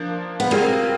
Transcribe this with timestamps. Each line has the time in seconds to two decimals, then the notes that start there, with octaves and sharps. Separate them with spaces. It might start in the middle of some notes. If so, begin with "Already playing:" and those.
Already playing: F3 A#3 D4
0.40 B3
0.51 G3 A#3 C4 F4 G#4